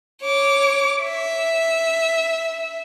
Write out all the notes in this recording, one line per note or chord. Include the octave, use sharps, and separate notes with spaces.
C#5 D6
E5